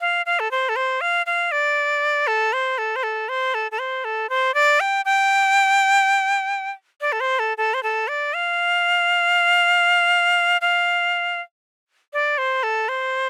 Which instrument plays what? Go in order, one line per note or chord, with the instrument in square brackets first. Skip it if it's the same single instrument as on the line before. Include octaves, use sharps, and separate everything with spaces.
[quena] F5
F5
A4
C5
A4
C5
F5
F5
D5
A4
C5
A4
C5
A4
C5
A4
A4
C5
A4
C5
D5
G5
G5
D5
A4
C5
A4
A4
C5
A4
D5
F5
F5
D5
C5
A4
C5